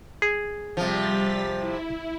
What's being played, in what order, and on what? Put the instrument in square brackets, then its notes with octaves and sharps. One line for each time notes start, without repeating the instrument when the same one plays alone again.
[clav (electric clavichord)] G#4
[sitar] C3 F3 [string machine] G3 A6 B6
[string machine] E4